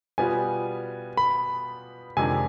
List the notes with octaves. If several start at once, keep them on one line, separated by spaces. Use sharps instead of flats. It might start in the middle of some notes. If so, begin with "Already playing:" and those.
B2 G3 B3 F4 G#5
B5
F2 C3 D#3 G#3 D4 G#5